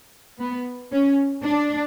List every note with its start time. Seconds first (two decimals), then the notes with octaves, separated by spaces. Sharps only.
0.39 B3
0.92 C#4
1.45 D4